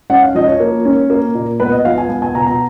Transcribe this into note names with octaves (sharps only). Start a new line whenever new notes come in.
C#4 F#5
F5
F3 D#5
C#5
A#3
C#4
A#3
A#2
B3 B4
D#5
F3 F5
G#5
B3
G#5
B2 A#5
A#5